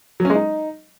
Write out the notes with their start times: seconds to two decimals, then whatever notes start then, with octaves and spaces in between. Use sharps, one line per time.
0.20 F#3
0.25 C#4
0.30 G#3
0.35 D#4